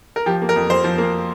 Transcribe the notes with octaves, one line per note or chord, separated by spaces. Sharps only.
A#4
F3 G4
A#3
A#4
F2
F2 C5
F3
A#3